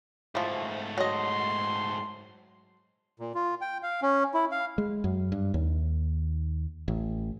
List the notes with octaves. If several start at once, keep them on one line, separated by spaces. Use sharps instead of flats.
G#2 E3 F3 A3
F#3 D#5 C6
A#2
F4
G5
F5
C#4
E4
F5
G#3
F#2
G2
D#2
A1